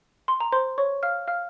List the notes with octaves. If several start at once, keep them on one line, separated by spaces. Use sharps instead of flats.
C6
A#5
C5 C6
C#5 C#6
F5 F6
F5 F6